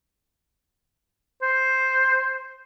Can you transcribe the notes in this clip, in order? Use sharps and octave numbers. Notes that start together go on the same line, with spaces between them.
C5